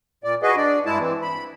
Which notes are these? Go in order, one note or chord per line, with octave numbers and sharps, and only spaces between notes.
A#2 D5
F#4 G#4 B4 D#5
D4 D5
G2 G#3 E4 A5
E3 C4
B5